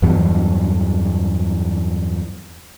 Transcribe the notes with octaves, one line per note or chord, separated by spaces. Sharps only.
E2 G2 E3 F#3